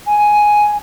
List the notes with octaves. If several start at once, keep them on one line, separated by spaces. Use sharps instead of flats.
G#5